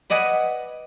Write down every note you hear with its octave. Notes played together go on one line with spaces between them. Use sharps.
B4 D5 D#5 F#5 G#5 B5